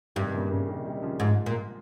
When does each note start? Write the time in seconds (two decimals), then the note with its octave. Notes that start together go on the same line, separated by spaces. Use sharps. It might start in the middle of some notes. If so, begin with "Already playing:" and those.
0.16 G2 C3 D#3
0.33 A#2 C#3
0.50 A#2 C#3
0.68 C3 D#3
0.86 D#3 G3
1.02 C#3 F3
1.20 G#2 F3 G#3
1.46 A#2